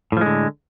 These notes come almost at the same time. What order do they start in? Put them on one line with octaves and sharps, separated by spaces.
A2 F3 G#3 D3